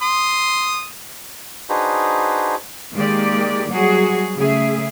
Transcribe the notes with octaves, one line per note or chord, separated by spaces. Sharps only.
C6 D#6
D4 D#4 F#4 G#4 B4 C5
D#3 G#3 A#3 G4 D5
F#3 G3 F#4 G#4
C#3 A3 G#4 E5